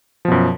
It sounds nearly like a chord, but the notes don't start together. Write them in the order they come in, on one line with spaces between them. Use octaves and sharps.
F3 B2 F#2